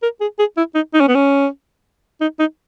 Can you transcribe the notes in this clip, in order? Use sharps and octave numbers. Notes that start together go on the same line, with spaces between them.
A#4
G#4
G#4
E4
D#4
D#4
C#4
B3
C#4
D#4
D#4